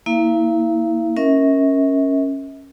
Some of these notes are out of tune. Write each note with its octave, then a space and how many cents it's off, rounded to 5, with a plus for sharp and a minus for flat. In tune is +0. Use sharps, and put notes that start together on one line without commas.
A#3 +0 E4 -25 F5 -45
C#4 -10 A#4 +0 E5 -40